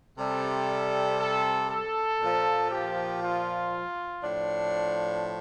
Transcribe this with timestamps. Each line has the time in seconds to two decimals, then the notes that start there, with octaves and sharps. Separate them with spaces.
0.17 C3 G3 A4
1.19 A4
1.69 A4
2.20 A#2 F3
2.71 G4
3.22 F4
4.22 A2 F3 D4